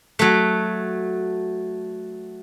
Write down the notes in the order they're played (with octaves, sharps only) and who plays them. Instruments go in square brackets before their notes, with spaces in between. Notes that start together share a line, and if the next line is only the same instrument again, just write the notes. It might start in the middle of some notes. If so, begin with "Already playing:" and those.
[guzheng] F#3 A3